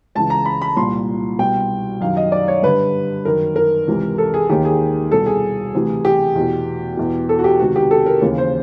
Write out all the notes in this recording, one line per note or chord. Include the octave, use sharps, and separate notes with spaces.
C#2 C#3 E3 A5
A#5
B5
B5
C2 A#2 C6
C2 B2 G5
F#2 D#3 F5
D#5
D5
C#5
G2 D3 B4
F#2 D#3 A#4
A#4
C#2 C3 E3
A4
G#4
D#2 D#3 G4
G#4
C2 B2 A4
G#4
D2 C3 E3
G4
E2 B2
E2 B2
A4
F#4
G4
C#2 C3 D#3 F#4
G4
A4
A#4
D#2 C#3 E3
C5